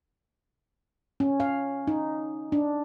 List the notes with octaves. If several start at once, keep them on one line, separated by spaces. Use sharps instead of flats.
C#4
F5
D#4
D4